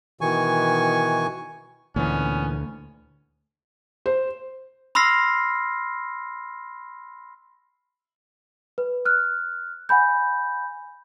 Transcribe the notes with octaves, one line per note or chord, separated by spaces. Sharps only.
B2 D#3 E3 G#5 C#6
D2 A#2 E3 B3 C#4
C5
B5 C6 E6 F6 A#6 C7
B4
F6 F#6
F#5 G#5 B5 G6